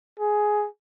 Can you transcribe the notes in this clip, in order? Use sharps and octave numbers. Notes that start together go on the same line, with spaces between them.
G#4